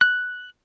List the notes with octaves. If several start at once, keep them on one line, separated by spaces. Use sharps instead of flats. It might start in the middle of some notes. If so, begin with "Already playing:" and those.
F#6